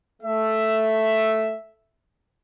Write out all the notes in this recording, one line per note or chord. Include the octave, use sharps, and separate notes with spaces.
A3 E5